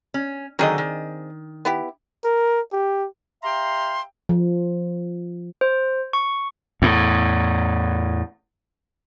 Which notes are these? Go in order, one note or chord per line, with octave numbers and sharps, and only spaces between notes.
C#4
D3 D#3 F#3 C4 G#4 D#5
D#3
B3 E4 G4
A#4
G4
G4 E5 F5 G5 A#5 C6
F3
C5
C#6
E2 A2